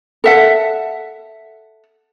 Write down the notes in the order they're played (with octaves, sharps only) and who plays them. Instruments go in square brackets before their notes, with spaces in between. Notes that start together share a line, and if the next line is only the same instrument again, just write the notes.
[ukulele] A4 E5 F#5